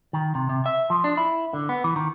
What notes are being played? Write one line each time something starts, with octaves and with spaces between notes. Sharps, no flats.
D#3
C3
C3
E5
F3
D4
E4
D3
B3
E3
D#3